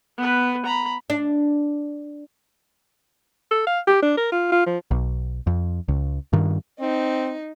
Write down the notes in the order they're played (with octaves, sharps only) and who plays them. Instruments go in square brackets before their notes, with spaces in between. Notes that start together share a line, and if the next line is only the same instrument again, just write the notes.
[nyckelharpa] B3 B4
A#5 B5
[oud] D4
[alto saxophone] A4
F5
G4
D4
A#4
F4
F4
F3
[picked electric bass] B1
F2
C#2
G2 D#3
[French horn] C4 [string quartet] D#4